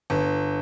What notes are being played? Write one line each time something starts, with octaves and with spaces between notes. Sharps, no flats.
G1